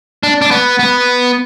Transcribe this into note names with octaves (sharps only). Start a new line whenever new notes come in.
D4
D4
B3
B3